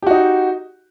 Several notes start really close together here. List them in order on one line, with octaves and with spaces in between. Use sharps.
G4 F#4 D#4